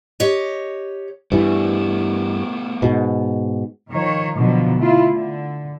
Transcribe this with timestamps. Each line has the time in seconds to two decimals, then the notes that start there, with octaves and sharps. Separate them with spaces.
0.20 G4 C#5 D#5
1.32 G2 E3 A3 B3
2.82 G#2 B2
3.90 D#3 F3 C#5
4.37 B2 D3 D#3 F3 F#3
4.78 A3 E4 F4
5.14 D3